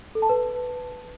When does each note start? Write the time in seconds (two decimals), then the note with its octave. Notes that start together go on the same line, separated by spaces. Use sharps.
0.15 A4
0.22 A5
0.29 B4